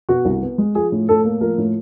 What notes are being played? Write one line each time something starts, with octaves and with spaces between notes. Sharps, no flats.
B2 F#4
C2
B3
G#3
F3 G#4
A2
A2 A4
A#3
F3 A#4
A2